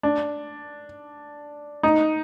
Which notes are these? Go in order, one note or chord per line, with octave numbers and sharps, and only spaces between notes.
D4
D#4